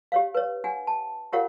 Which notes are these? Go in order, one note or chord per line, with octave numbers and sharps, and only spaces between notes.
G4 C#5 F5
B4 C#5
D4 F#5 G#5
A5
F4 G4 A#4 C#5 F5 F#5